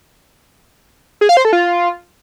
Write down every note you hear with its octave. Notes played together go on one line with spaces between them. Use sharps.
G#4
F5
C5
A4
F4